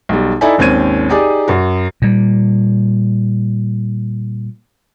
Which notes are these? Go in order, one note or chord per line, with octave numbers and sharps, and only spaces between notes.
B1 G3
D#4 E4 A4 D5 E5 G#5
G#1 D#2 C4 C#4 G#6 D#7
D#4 G4 G#4 D5
F#2 F#4
A#2 G3